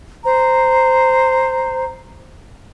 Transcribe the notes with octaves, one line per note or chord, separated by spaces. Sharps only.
C5 A#5